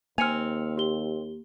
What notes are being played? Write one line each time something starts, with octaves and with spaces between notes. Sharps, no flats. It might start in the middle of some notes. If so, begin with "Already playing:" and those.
D#2 A#3 C4 G#5 F6 C#7 F7
G4 G7